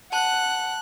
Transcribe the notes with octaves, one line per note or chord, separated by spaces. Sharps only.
F#5 A5 F#6